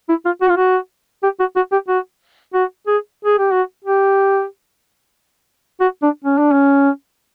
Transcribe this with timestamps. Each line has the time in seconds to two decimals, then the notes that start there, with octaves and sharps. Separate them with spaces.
0.09 E4
0.25 F4
0.42 F#4
0.50 F4
0.57 F#4
1.23 G4
1.40 F#4
1.56 F#4
1.72 G4
1.88 F#4
2.54 F#4
2.87 G#4
3.25 G#4
3.39 G4
3.52 F#4
3.85 G4
5.80 F#4
6.02 D4
6.25 C#4
6.38 D4
6.52 C#4